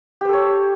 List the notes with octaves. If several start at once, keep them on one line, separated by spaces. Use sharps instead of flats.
G4 A4 C5 C#5